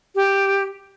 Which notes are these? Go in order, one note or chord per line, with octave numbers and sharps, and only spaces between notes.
G4